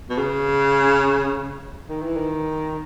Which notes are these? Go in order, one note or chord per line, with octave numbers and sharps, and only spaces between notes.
B2
C#3
D#3
E3
D#3